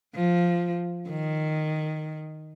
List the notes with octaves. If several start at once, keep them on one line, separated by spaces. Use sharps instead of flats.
F3
D#3